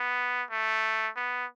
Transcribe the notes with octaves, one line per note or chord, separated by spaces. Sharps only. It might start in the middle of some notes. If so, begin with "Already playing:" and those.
Already playing: B3
A3
B3